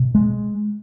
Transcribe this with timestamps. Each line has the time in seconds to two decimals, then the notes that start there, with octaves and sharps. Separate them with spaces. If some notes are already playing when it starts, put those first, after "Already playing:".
Already playing: B2
0.15 G#3